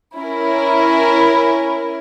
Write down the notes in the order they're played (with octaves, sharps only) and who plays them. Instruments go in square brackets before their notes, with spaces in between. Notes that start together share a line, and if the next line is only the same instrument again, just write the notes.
[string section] C#4 E4 A#4